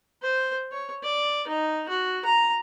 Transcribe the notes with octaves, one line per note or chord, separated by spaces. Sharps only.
C5
C#5
D5
D#4
F#4
A#5